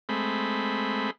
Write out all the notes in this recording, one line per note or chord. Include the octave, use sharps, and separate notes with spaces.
G#3 A3 C4 B5